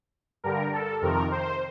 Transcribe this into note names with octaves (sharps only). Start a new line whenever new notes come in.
G2 D3 G3 A#4
A4
F2 C3 D#3 A#4
C5